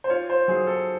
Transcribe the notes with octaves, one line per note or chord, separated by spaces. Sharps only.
C5
F4 C#5
C5
F#3 G#4
A4